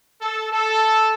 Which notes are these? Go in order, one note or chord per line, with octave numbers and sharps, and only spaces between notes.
A4
A4